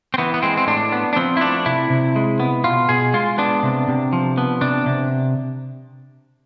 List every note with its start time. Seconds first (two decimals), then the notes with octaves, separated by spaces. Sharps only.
0.14 C4
0.18 E3 B3
0.34 B3
0.42 G#3 C4
0.57 C4
0.67 A2 D4
0.92 B3
1.13 D4
1.16 F3 C4
1.37 E4
1.41 A3 D4
1.66 C3 E4
1.90 C3
2.16 G#3
2.40 B3
2.64 B2 F4
2.89 B2 G#4
3.14 G#3 F4
3.38 B3 D4
3.63 C3
3.88 C3
4.13 F3
4.38 B3
4.61 C3 D4
4.86 C3